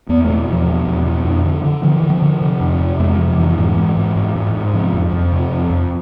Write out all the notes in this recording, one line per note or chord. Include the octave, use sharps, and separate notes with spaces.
E2 B3
B2 A3
E2 F3
B2
E2
B2
F2
D3
D3
D3 F3
E3
D3
F3
D3
C3
F2
C3
F2 G#3
C3 F3
F2 E3
G#2 E3
G#2
G#2
G#2
G#2
G#2
C3 F3
F2
F2
C3
F2
F2